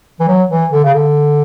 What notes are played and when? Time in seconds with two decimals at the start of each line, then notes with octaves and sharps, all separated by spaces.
0.20 E3
0.28 F#3
0.50 E3
0.72 D3
0.84 C#3
0.94 D3